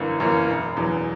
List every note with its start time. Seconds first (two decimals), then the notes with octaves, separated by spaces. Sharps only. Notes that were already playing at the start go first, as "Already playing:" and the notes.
Already playing: G1 F#2 E3 A#3 C#4
0.20 F#2 E3 A#3 C#4
0.48 E1
0.77 E2 B2 F#3